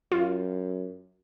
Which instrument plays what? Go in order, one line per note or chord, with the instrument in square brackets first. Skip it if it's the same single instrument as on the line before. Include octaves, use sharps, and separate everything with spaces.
[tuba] F#2 [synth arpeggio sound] F4